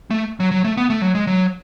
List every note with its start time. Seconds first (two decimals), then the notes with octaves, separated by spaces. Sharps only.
0.11 A3
0.40 F#3
0.51 F#3
0.64 A3
0.77 B3
0.90 A3
1.02 F#3
1.15 G#3
1.27 F#3